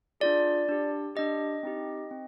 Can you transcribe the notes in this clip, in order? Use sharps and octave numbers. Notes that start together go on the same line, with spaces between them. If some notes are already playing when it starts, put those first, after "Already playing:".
D4 F4 G#4 D5
D4 G4
D4 G4 D#5
C4 D#4 G4
C4